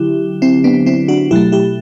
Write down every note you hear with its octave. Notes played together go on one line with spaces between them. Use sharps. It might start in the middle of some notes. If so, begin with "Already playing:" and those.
Already playing: D3 F#3 E4 G4
C4 E4
B3 D4
C4 E4
D4 F#4
B2 F#3 A3 E4 G4
E4 G4